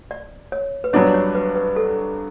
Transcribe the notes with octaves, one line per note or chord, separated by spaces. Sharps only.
D5
C#5
B4
G2 F#3 B3 D4 F#4 C#5
C#5
B4
B4
A4